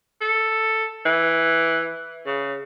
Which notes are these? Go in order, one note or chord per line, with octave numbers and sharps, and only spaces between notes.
A4
E3
C#3